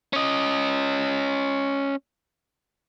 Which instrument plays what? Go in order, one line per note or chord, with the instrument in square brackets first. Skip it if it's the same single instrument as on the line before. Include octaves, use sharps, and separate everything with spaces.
[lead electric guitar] C#4 D#5